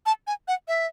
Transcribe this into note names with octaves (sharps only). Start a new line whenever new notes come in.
A5
G#5
F#5
E5